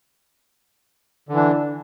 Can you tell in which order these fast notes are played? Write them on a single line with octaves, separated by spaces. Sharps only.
D3 E3 D4